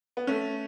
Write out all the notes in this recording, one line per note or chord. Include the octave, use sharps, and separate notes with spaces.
B3
A3 C#4